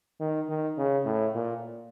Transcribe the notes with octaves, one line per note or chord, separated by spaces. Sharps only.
D#3
D#3
C#3
A2
A#2